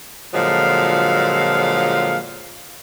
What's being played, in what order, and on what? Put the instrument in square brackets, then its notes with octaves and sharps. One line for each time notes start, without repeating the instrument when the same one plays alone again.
[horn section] A#2 D3 F3 F#3 G#3 F5